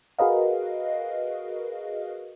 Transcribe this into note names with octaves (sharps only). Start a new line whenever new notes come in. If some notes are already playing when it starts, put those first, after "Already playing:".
F#4 G#4 A#4 B4 D#5 F5